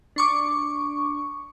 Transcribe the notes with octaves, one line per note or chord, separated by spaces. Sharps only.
D4 C#6 D6